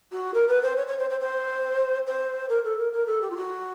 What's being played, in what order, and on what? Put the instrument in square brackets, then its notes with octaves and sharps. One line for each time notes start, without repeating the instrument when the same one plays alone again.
[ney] F#4
A#4
B4
C5
C#5
C#5
C5
C5
C5
C5
A#4
A4
A#4
A#4
A4
G4
F4
F#4